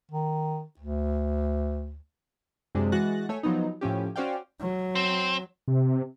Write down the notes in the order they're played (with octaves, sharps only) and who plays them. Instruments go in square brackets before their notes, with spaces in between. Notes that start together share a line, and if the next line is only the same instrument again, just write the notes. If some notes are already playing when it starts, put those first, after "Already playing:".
[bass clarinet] D#3
D2
[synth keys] F#2 C3 G#3 D4
E3 G#3 F#4 F#6 A6 A#6
A3 C#5 G#5
F3 F#3 B3 D#4
A2 F3 C#4 G4
C#4 F#4 C5 D5 F5 G5
[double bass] F#3
[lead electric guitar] C4
[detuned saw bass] C3